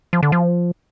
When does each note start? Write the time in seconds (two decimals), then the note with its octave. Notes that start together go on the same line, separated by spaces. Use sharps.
0.13 F3
0.23 D3
0.32 F3